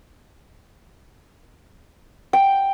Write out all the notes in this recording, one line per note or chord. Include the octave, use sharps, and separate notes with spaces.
G5